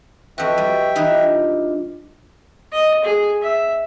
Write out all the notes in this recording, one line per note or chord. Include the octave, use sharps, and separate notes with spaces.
F2 F#4 B4 D#5 E5 G5 C#6
G3
E3 D#4 B4
D4 F4
D#5
G#4
E5